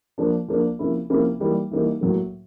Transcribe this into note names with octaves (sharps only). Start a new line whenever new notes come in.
F3 A#3 D4
F3 A#3 D4
C3 F3 A#3 C#4 E4
C3 F3 A#3 C#4 E4
E3 G3 A#3 D#4
E3 G3 A#3 D#4
A2 F#3 A#3